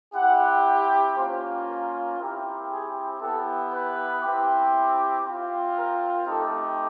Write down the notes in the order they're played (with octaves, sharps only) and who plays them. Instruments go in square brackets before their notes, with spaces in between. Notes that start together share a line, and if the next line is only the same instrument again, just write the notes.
[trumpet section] C4 E4 G4 F#5
A#3 C#4 F4 C5
A#4
C4 E4 G4 A#4
G#4
B3 E4 G4 A4
B4
C4 E4 G4
C4 F4
A#4
A3 C4 D#4 G4 A4